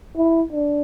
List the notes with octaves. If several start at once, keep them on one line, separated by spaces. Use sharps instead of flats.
E4
D4